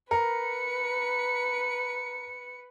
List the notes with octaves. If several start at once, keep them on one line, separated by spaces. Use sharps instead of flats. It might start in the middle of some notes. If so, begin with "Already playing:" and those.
A#4 B4 C#7